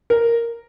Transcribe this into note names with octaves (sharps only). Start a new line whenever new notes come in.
A#4